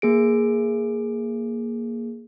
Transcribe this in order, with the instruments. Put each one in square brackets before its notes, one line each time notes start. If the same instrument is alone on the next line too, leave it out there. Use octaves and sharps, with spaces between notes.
[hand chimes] A#3 G#4 D7